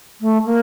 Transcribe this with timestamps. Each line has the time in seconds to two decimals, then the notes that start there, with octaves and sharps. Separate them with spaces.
0.21 A3
0.45 A#3